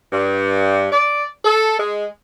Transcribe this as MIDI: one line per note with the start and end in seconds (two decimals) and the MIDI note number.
0.13 0.88 43
0.92 1.25 74
1.45 1.77 69
1.79 2.05 56